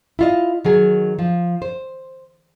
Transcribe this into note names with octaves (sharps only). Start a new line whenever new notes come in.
E4 F4 D#5
D#3 F#3 G#4
F3
C5